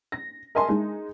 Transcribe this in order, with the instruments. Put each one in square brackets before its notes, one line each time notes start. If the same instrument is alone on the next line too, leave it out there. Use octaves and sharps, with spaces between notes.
[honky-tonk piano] A#6
A#4 D#5 E5 G#5 A5 C6
G#3 D#4